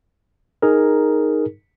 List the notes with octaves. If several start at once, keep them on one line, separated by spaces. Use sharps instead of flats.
D#4 G#4 A#4